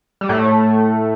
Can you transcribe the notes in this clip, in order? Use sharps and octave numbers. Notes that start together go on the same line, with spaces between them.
G3
A2 A3